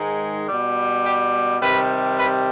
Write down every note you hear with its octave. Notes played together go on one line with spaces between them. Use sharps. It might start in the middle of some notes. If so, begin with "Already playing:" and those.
Already playing: G#2 D#3 G#3
B2 G3
G4
C3 D#3 G3 B4
B4